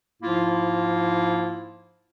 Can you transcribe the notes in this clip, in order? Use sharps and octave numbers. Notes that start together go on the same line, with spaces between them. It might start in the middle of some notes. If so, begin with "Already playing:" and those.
G#2 F3 A#3 E4 F4